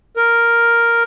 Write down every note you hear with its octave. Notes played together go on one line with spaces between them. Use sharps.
A#4